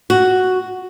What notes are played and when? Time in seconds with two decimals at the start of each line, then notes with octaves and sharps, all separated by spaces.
0.10 F#4